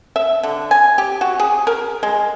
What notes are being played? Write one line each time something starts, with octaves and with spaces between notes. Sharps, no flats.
E5
D3
G#5
G4
F#4
G#4
A#4
G#3